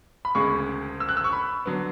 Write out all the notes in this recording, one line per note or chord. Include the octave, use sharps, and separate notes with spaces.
B5
E1 D2 C#3 G#3 C#6
E6
F#6
E6
C#6
B5
D3 F#3 B3